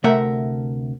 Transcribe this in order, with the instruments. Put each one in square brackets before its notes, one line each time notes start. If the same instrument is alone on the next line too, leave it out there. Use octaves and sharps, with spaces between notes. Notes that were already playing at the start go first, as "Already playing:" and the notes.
[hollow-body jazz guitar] D2 C3 A3 A#4 E5 F#5